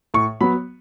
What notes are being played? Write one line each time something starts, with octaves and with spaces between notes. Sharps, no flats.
A2 C#6
F#3 B3 B5